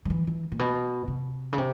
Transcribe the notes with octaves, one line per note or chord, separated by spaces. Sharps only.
F3
E3
E3
A#2
B2
C3
C#3
C3